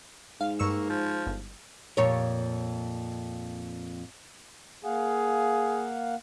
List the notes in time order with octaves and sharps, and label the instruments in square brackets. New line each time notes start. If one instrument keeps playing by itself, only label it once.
[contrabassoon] G#2 [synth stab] F5
[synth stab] G2 C#6 E6 [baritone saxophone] A#3
[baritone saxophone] F3
[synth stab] G1
[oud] F2 A#2 C#5
[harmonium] A#3 F5 F#5 [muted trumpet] G#4